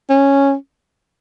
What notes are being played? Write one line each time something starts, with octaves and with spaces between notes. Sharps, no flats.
C#4